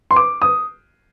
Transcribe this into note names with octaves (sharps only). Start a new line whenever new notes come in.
C6
D6
D#6